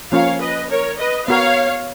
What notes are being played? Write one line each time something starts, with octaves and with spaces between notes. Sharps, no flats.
F3 A#3 C#4 F4 A#4 C#5 F5
B4 D#5
A#4 C#5
B4 D#5
B3 F#4 A#4 C#5 F5